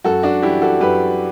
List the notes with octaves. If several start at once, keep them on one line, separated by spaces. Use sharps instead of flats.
F#2 F#4 A4
D4 F#4
E3 G3 E4 G4
F#4 A4
F#2 G4 B4